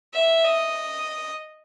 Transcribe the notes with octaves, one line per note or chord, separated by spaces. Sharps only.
E5
D#5